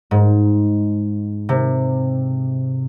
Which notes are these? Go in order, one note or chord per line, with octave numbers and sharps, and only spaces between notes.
G#2
C3